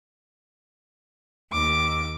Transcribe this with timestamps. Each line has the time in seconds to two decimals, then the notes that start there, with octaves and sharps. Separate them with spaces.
1.52 D#2 D6